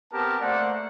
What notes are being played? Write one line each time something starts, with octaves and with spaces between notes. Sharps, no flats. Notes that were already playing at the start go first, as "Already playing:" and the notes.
B3 C4 G4 A#4 A5
A3 A#3 C5 D5 F#5